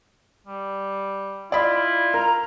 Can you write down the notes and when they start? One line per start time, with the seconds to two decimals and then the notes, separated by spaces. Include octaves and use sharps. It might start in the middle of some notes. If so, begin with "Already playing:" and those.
0.47 G3
1.52 E4 F4 D5 D#5 B5
2.14 A#4 A#5